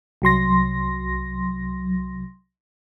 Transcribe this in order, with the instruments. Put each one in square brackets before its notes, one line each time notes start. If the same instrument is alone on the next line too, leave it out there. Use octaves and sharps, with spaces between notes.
[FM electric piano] C2 F#3 C6 A#6